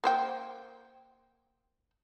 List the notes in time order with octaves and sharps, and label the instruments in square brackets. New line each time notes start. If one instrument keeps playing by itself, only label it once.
[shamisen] A#3 C5 G5